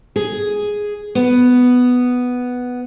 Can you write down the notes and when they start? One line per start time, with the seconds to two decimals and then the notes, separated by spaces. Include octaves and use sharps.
0.16 G#4
1.15 B3